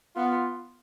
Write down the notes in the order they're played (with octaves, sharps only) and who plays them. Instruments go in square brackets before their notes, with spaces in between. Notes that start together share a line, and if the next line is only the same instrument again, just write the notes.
[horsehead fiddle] B3 [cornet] F4